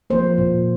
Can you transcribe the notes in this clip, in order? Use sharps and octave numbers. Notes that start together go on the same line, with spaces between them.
F3 A#3 C5
A#2